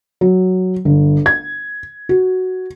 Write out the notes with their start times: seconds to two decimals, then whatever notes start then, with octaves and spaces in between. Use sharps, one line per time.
0.21 F#3
0.85 G1
1.26 G#6
2.09 F#4